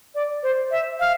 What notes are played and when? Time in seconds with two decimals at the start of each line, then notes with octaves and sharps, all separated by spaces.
0.15 D5
0.43 C5
0.71 E5
1.00 F5